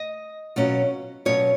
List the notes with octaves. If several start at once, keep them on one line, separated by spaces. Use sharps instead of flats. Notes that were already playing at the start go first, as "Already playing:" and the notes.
Already playing: D#5
B2 F#3 C#4 F4
B2 F#3 C#4 F4 C#5